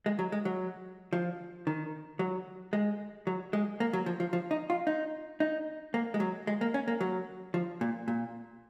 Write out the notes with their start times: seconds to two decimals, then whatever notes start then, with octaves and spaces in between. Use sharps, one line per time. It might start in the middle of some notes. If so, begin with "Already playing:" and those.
0.06 G#3
0.19 F#3
0.32 G#3
0.45 F#3
1.13 F3
1.67 D#3
2.19 F#3
2.73 G#3
3.27 F#3
3.53 G#3
3.80 A#3
3.93 F#3
4.06 F3
4.20 F3
4.33 F3
4.51 D#4
4.70 F4
4.87 D#4
5.40 D#4
5.94 A#3
6.14 G#3
6.20 F#3
6.47 G#3
6.61 A#3
6.74 C#4
6.88 A#3
7.01 F#3
7.54 F3
7.81 A#2
8.08 A#2